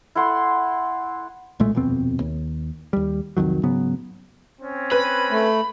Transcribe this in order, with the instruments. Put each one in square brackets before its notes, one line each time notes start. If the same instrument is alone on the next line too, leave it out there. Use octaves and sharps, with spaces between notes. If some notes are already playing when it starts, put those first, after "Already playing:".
[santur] E4 A4 F#5 C6
[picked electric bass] B1 A#2 G#3 A3
D#1 F2 B2 C4
D#2
D#2 G3
C2 F2 D#3 F#3
G#2 C#3 F#3 B3
[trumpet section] C4 C#4
[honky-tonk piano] B4 [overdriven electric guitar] B5
[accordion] A3